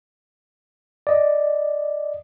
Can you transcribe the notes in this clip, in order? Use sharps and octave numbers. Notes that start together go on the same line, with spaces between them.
D5 D#5